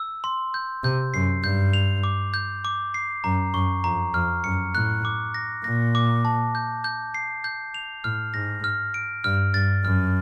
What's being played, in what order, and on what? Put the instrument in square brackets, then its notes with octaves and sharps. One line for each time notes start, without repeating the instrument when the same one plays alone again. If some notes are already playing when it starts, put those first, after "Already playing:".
Already playing: [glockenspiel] E6
C6
G6
[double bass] C3 [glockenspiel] G6
[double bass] F#2 [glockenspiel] C7
[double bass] G2 [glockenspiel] G6
[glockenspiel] F7
D6
G6
D6
C7
[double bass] F#2 [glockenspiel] A#5
[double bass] F#2 [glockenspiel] C#6
[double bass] F2 [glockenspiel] A#5
[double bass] F2 [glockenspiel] F6
[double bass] F#2 [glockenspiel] C#7
[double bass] A2 [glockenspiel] F#6
[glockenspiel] D6
A#6
[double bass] A#2 [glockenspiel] A#6
[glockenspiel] D6
A5
G6
G6
C7
G6
F7
[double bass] A2 [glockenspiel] F6
[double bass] G#2 [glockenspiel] A#6
[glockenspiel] F6
D7
[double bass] G2 [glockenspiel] F6
[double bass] G2 [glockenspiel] A6
[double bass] F#2 [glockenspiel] F6